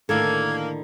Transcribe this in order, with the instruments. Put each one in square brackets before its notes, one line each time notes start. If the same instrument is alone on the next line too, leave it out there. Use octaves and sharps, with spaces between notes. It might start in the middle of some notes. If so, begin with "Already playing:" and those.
[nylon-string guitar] A2 D3 D#3 [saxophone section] A#3 [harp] A4 [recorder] G#6